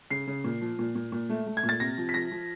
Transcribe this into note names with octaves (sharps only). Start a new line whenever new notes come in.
C#3 C7
C#3
A#2
F3
A#2
A#2
A#2
A3
A3
G#6
A#2
A6
C3 A#6
F3
B6
F3 A#6
F3